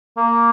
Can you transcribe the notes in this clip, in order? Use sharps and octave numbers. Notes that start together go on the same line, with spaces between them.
A#3